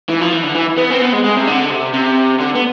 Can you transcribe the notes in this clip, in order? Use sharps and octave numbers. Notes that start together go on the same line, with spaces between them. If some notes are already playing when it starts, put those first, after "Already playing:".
E3
F3
E3
D3
E3
B3
C4
B3
G#3
G#3
C3
D3
C3
C3
D3
B3